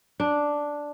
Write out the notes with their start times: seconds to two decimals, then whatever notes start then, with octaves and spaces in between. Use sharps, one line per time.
0.20 D4